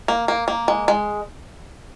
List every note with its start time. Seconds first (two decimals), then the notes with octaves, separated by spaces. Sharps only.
0.08 A#3
0.28 A#3
0.48 A#3
0.68 G#3
0.88 G#3